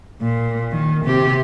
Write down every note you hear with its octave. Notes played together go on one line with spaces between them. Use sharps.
A#2
D#3
C3 G4